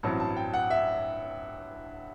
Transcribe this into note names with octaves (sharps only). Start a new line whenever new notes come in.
A1 G2 F#3 C4 E4 A5
A5
G5
F#5
E5